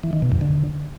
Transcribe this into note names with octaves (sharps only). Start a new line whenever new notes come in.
E3
D#3
B2
F2
D3